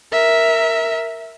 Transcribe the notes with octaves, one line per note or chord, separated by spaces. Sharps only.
A#4 E5